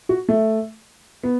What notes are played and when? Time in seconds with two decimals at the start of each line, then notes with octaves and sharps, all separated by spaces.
0.09 F#4
0.29 A3
1.23 B3